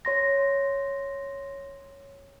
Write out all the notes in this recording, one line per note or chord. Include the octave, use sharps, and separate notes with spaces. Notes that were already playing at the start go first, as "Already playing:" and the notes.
C#5 C6 A#6